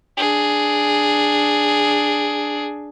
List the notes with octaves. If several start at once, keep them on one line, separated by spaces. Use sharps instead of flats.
D4 G#4